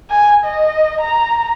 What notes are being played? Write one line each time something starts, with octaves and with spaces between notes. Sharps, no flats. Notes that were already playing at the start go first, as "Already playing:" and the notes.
G#5
D#5
A#5